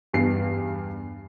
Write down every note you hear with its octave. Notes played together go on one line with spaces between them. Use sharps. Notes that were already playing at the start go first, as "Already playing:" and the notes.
E2 G2 B3 C7